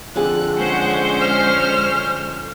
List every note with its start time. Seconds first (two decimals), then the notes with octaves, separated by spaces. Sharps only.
0.16 F2 D3 G#4 F#6
0.57 G#3 C#4 C5 F#5
1.20 F6